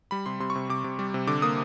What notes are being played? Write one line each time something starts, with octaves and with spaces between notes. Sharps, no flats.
G3 B5
C3 C6
C3 C6
C#6
C3
C3 D6
C3
G3
C3
D3 D6
A#3 D#6